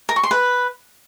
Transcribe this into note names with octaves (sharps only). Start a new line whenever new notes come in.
A#4
C#6
C6
B4